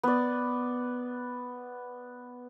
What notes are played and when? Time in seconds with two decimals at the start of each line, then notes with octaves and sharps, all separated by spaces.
0.03 B3 D5